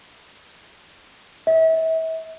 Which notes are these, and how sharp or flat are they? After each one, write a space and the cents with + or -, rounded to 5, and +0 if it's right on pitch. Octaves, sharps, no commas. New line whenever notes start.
E5 -35